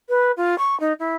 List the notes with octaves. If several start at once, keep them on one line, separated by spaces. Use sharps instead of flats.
B4
F4
C#6
D#4
E4